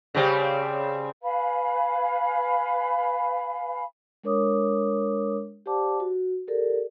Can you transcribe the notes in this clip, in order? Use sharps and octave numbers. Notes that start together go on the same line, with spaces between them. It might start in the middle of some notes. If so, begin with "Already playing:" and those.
C#3 G3 C4
B4 F5 G#5 B5
G#3 D4 A#4 C#5 D6 D#6
G4 C5 D5 F#5 A5 D6
F#4
G4 A4 A#4 D5